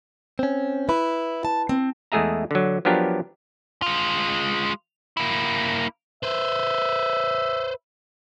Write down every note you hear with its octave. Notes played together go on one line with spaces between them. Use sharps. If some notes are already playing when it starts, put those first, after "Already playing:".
C4 C#4
E4 B4 B5
A5
C4
E2 G#3 A3 G#4 E5 A#5
D3 F#3
F3 F#3 B3 D4 G4 A#4
G#3 F4
A#3 E4
B4 C5 E5